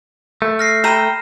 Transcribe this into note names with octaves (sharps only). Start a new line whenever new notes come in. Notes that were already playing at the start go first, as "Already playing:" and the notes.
A3
F6 A#6 C7
G5 A#5 B5 D#7 E7